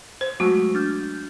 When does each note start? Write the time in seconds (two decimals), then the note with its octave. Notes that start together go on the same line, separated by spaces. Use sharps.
0.21 C5
0.40 F#3 G#3 A3 F#4
0.75 D4 F6 G6